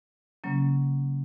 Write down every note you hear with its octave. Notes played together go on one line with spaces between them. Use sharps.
C#3 F#3 A#3 C#4